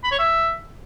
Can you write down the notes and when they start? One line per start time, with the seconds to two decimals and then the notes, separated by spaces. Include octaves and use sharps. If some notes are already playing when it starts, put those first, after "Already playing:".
0.04 B5
0.11 C#5
0.19 E5